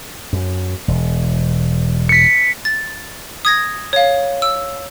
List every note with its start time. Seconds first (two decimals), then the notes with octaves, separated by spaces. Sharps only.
0.33 F#2
0.88 E1
2.09 B6 C#7
2.65 A6
3.45 D#6 G#6 A#6
3.93 C#5 F5
4.42 E6